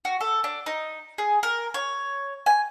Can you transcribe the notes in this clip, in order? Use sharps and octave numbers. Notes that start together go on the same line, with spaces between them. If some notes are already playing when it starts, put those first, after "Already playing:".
F#4
A4
D4
D#4
G#4
A#4
C#5
G#5